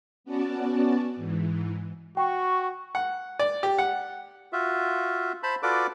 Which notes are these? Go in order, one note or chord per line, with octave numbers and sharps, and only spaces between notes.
B3 C#4 F#4 D5 A5
G#2 E3
F#4 G5 C#6
F#5
D5
G4
F#5
F4 F#4 E5
C5 A5 B5
F4 F#4 A4 B4 D5 D6